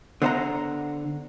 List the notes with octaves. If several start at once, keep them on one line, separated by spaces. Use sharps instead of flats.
D3 B3 C5 E5 F#5 A#5